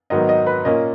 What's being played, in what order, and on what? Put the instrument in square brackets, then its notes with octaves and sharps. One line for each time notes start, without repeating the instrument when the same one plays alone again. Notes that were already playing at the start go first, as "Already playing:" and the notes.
[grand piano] G#2 D#3 F#3 B3 D#5
D#5
B4
A#2 A#3 C#4 D#5